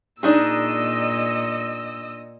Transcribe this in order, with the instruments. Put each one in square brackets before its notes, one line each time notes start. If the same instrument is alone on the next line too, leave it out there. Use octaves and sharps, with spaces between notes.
[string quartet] A#2 [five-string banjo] D4 D#4 G#4 [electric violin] D#5 E6